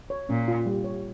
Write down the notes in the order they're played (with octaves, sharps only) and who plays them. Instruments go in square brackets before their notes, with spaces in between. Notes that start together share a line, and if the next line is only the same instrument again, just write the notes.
[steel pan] C#5
[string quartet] A#2 [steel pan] C#4
[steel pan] F4
G3
C#5